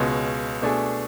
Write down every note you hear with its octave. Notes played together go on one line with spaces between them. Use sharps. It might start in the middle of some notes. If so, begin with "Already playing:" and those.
Already playing: C#2 B2 G#3 C#4
B2 A3 D4 G#4